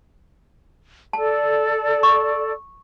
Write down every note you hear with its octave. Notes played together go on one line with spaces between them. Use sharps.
A4 D5 A5
C#6